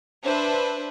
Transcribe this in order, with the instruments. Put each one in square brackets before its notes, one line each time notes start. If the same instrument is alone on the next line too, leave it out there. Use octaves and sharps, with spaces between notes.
[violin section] D4 B4 C5 E5